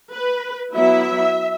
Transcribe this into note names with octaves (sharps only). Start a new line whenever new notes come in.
B4
F#3 B3 E4 E5